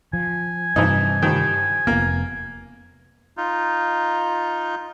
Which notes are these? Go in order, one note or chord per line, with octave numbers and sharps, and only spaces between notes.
F3 G#5
G2 C3 E3 F3 D#4
D#3 F3 G3
F1 A#3 B3
D#4 F4